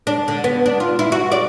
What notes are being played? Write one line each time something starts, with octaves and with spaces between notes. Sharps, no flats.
D4
D3
B3
D4
F4
E4
F#4
D5